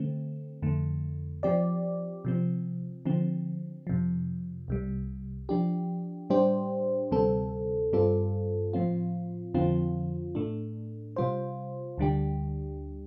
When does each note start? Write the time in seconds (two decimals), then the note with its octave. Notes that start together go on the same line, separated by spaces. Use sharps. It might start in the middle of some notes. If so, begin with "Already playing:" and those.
Already playing: D3 A3 C4
0.62 F2 D3 A3
1.43 F3 C4 G4 D5
2.25 C3 F3 C4
3.05 D3 F3 C4
3.87 F2 C3 F3
4.68 C2 C3 G3
5.49 F3 D4 G4
6.30 A2 G3 D4 G4 C5
7.11 D2 C3 G3 C4 A4
7.93 G2 G3 C4 F4 A4
8.73 A2 F3 C4 F4
9.54 F2 D3 F3 C4 F4
10.35 A2 A3 D4
11.16 C3 G3 F4 C5
11.98 D2 D3 G3 D4 G4